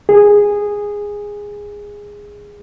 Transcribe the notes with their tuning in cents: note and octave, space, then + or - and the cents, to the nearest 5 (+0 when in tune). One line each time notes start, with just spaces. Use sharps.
G#4 -10